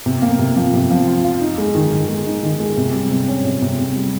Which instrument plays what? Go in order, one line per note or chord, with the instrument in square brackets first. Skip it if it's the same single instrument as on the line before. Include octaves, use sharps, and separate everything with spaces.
[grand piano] C3
A#3
C3
F3
C3
F3
F4
F4
D#4
G#3
D#3
D#3
G#3
D#4
D#3
G#3
C3
G3
C3
C#4
C3
C3
C3
G3